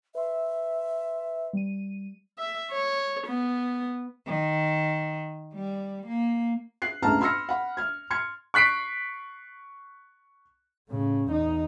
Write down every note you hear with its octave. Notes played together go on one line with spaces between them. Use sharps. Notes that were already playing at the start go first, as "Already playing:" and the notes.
B4 E5 C6
G3 D#7
E5
C#5
B3
D#3
G3
A#3
F#6 C7
G1 C#2 A2 A5 A#5 F6
B5 C6 E6 F6 A#6 C#7
F#5 B5
F6 G#6
C6 F6 G#6 C#7
C#6 F#6 B6 C7 D7
A2 C#3
E2 D#4